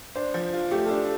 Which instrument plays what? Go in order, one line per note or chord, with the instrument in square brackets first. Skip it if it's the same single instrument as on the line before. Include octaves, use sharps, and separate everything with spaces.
[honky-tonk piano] D4 [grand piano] C5
[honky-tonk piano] F3
F4
[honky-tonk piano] A3 [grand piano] G4
[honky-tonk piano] D4 [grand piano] A4